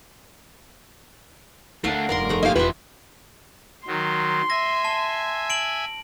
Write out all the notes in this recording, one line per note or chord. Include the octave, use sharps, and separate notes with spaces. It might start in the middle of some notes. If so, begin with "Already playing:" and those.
D2 A3 D4 A#4 F5 F#5
F1 G2 A#4 D5 A#5 C6
G#3 A3 D#5
A#3 F4 G4 D#5 F5 G#5
E1 E3 C4 F4 F#4 B4 E5 C6
D#3 F#3 C6
E5 G#5 A#6
A5
D7 F#7